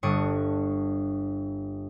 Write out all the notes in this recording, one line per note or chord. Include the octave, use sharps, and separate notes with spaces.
G1 G2 D4 C#6 D#6